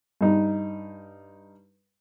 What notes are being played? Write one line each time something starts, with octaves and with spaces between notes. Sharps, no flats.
G2 D#4